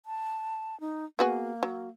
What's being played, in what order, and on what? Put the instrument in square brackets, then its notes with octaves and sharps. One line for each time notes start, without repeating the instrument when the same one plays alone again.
[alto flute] A5
D#4
[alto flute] A#3 [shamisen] B3 F#4 G#4
[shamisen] F#3